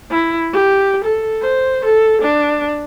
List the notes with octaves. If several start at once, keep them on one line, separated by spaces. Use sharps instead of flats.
E4
G4
A4
C5
A4
D4